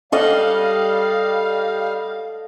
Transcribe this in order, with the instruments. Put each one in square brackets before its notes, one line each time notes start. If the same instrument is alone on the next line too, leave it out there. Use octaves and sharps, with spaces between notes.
[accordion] G3 F5 [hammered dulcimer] A4 D#5 F#5